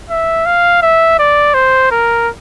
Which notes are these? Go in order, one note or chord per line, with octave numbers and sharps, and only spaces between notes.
E5
F5
E5
D5
C5
A#4